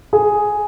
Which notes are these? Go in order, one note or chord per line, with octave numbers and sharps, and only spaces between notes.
G#4